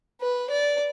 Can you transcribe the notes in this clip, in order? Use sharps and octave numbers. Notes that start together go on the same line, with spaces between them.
B4
D5